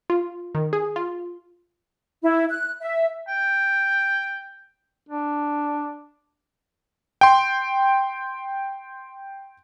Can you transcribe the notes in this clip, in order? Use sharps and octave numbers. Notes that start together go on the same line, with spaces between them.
F4
D#3
G#4
F4
E4
F#6
E5
G5
D4
G5 C6